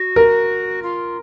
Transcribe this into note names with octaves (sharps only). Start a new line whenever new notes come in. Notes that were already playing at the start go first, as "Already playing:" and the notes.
Already playing: F#4
A#4
F4